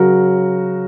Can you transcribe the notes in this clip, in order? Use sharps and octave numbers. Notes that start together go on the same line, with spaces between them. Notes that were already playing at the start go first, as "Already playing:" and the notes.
Already playing: C#3 F#3 F#4 A#4